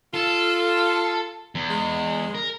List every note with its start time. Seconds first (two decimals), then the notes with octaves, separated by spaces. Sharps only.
0.14 F4 A4
1.55 E2
1.70 G#3
2.35 A#4